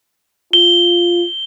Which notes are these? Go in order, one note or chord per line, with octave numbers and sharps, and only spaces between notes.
F4 G7